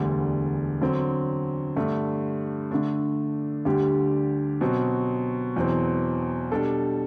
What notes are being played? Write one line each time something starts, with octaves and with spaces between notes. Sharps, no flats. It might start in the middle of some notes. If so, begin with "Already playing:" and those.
Already playing: E1 D2 D3 G3
D3 F#3 C4
G2 D3 A3
D3 A3 D4
D2 D3 G3 D4 G4
B2 F#3 C4 F#4
E2 B2 F#3 C4
B2 G3 D4 A4